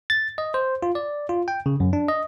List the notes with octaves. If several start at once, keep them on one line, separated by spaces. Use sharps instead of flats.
A6
D#5
C5
F4
D5
F4
G5
C#3
F#2
D4
D#5